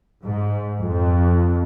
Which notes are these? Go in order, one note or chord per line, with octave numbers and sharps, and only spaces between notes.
G#2
F2